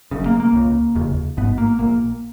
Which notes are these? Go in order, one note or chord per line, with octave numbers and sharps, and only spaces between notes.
F#1 F#2 C#3
A#3
A#3
C#2 C#3
F1 D#2 C#3
G#1 G#2 B3
A#3
A#1 A#2 A#3